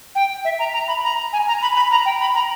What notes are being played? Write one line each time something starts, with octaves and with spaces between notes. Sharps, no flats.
G5
E5
A#5
A#5
B5
A#5
G#5
A#5
B5
B5
A#5
G5
B5
A#5